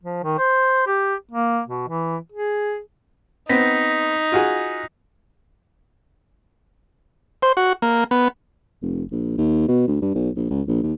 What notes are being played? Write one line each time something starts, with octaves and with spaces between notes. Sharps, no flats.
F3
D#3
C5
G4
A#3
B2
E3
G#4
B3 C4 D#4 A#6 B6
F4 F#4 G#4
C5
F#4
A#3
B3
F1
A#1
D#2
B2
D2
G2
B1
A#1
C#2
A#1
D#2